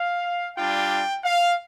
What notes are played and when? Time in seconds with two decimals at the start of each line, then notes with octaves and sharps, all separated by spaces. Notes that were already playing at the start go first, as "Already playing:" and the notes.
Already playing: F5
0.56 G3 D4 F4 G5
1.24 F5